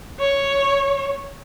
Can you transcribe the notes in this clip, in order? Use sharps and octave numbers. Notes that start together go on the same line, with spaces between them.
C#5